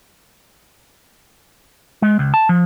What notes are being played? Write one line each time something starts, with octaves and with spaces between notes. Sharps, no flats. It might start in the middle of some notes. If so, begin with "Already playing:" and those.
G#3
C#2
A5
F3